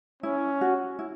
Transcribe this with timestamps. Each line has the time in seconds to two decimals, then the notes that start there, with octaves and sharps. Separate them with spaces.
0.23 C#4 E4
0.61 F#4
0.99 E4